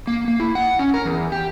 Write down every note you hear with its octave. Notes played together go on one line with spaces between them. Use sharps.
A#3
A#3
E4
F#5
C#4
A#4
E2
G4